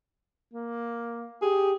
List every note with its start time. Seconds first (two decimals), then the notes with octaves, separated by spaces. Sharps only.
0.54 A#3
1.42 G4 G#4